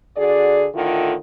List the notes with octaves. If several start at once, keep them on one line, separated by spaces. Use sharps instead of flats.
D3 F#4 G#4 D5
A2 D3 D#3 E4 F4